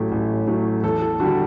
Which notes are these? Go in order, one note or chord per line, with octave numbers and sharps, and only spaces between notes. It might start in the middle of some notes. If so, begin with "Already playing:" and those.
Already playing: A1 A2 F#3 A3 G4
A1
A2 F#3 A3
E2 A4
A4
D3 G3 F#4